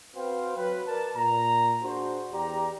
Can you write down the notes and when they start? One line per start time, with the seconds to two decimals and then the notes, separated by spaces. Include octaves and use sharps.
0.15 C4 F#4 B4 C5 F5 G5
0.57 F#3 B4
0.87 A#4 B4 D5 A5
1.16 A#2 A#5
1.82 D4 F#4 G#4 C5
2.32 E2 G4 D5 A#5